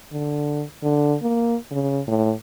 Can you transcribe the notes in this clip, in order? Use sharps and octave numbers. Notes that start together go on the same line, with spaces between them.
D3
D3
A#3
C#3
A2